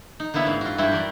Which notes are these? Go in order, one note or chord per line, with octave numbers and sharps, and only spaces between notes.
D#4
D3 A#3 B3 E4 B4 C#5
G#2 C4 B5
F4 F#4
G2 E4 B4 C5 G5
G3 D4 F#4 A#4